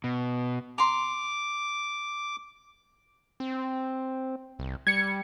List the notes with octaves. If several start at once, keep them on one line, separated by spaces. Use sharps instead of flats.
B2
A#5 C6 D6
C4
C2
G3 G#6 C#7